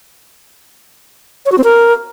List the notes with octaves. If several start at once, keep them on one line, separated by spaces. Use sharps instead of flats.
C#5
F#4
C4
A#4